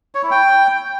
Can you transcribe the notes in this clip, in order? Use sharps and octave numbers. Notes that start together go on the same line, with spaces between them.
C#5
E4
G5